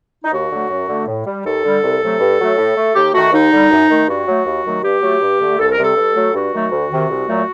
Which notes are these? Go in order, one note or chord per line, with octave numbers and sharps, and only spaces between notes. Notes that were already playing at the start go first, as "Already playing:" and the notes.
D#4
D#2 F#4
D3 F#3 A3
F#2
D3 A3
A2
G3
D#2 A4
D3 G3
C2
C3 F#3 A3
G2
F#3 A3
A2
A3
D#2 G4
D#3 A3 F#4
D#2 D#4
D3 G3
F#2
D#3 A3
G2 F#4
F#3 A3
D#2
D#3 F#3 A3
G2 G4
F#3 A3
G2
D3 A3
C2 A4
A#4
C3 G3
A4
G2
F#3 A3
G2 F#4
D#3 F#3 A3
D2
C3 D#3
C2
A#2 F#3 A3